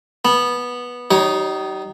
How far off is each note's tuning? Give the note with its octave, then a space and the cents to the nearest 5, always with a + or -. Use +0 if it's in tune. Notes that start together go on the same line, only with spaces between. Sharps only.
B3 -10 A5 -35
G3 -40 D#4 +0 C#5 +0